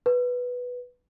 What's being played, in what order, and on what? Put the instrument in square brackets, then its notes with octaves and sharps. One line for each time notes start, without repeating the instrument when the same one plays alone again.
[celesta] B4